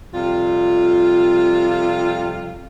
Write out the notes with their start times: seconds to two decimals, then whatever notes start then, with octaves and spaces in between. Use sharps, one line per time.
0.14 F2 C3 G3 F4